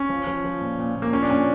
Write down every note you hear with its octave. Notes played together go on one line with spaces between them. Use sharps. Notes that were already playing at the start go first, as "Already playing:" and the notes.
Already playing: C#4
F3
F3
F3
A#2
A#2
A#2
A#3
F3 C#4
D4
A#2 C#4